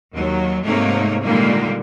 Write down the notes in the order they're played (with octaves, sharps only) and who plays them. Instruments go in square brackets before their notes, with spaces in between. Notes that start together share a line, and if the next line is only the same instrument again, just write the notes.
[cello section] D#2 F#3
G#2 C3 A3 A#3 D#4 C#5
A#2 D3 D#3 G3 G#3 A#3